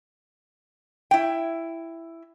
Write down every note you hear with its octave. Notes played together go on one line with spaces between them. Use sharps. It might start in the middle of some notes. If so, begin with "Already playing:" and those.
E4 G5